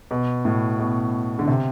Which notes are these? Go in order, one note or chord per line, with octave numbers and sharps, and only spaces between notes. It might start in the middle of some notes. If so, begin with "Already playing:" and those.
B2
A2
B2
D3
C3